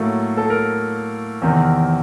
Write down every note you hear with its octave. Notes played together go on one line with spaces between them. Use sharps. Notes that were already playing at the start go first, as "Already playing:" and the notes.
Already playing: A2 F#3 A#3 A4
A4
A#4
E2 C3 D#3